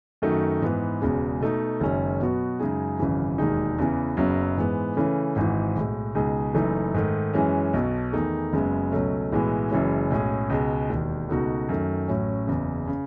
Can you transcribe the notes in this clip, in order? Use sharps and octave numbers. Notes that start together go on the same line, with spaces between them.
F#2 D#3 A3 D#4 F#4
G#2 E3 B3
E1 E2 C#3 G#3
B2 A3 D#4
F#1 F#2 D#3 G#3 C#4
B2 F#3 B3 F#4
F#2 C#3 G#3 D#4 G#4
G#1 F#2 C#3 E3
E1 D#2 D#3 G#3 D#4
E2 C#3 E3
F#1 F#2 C#3 F#3 B3
G#2 E3 G#3 B3
C#3 E3 A3 C#4
G#1 G#2 E3
B1 A2 G#3
C#2 B2 G#3 D#4 G#4
F#1 F#2 E3 A3 D#4
G#2 D#3 A3
F#2 E3 G#3 C#4
B1 B2 F#3
E2 D#3 A3 D#4 G#4
F#1 F#2 C#3 G#3 B3
C#2 B2 F#3 A3 C#4
B1 A2 E3 G#3 B3
F#1 F#2 E3 G#3 C#4
B1 A2 G#3 C#4 G#4
C#2 B2 G#3
E1 D#2 D#3
C#2 B2 A3 D#4 F#4
F#2 D#3 A3
A1 A2 F#3 C#4
F#1 E2 C#3
C#3